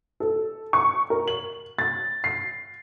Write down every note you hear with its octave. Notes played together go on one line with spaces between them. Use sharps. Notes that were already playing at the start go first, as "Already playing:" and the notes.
A4
C#6
A#4
F#7
A6
C7